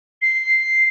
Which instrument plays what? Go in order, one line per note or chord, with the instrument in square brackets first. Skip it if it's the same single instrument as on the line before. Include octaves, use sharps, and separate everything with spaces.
[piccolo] C7